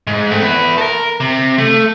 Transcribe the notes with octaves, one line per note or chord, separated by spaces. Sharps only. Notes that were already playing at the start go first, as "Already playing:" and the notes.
G#2
A3 C4
B3 E4
A4 A#4
C3
A3